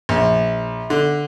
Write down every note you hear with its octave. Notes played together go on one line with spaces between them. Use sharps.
A#1
D3